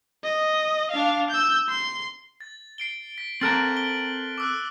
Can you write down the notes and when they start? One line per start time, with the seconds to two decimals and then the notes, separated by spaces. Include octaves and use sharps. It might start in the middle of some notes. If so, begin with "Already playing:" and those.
0.24 D#5
0.91 D4 F5
1.30 E6 G6
1.69 C6
2.41 A6
2.78 C7 D7 G7
3.18 B6
3.41 C4 A4 A#4 F6 F#6 A6 D7 F#7
3.77 G7
4.38 D6 E6 F#6